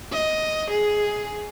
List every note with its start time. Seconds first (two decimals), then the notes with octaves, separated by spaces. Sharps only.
0.12 D#5
0.71 G#4